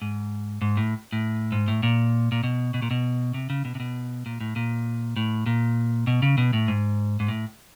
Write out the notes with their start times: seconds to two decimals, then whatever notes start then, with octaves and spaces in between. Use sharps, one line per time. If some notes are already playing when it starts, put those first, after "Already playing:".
0.02 G#2
0.62 G#2
0.77 A2
1.12 A2
1.52 G#2
1.68 A2
1.83 A#2
2.32 A#2
2.44 B2
2.74 B2
2.82 A#2
2.91 B2
3.34 C3
3.50 C#3
3.65 B2
3.75 C3
3.80 B2
4.26 A#2
4.41 A2
4.56 A#2
5.16 A2
5.46 A#2
6.07 B2
6.22 C#3
6.38 B2
6.53 A2
6.68 G#2
7.20 G#2
7.28 A2